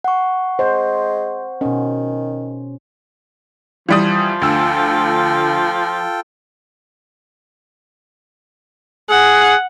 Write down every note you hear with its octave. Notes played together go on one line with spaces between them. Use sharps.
F#5 C#6
G#3 C5
B2 D#3 C#4
E3 F3 G3 D#6
D2 F4 A4 G5 E6
G#4 F#5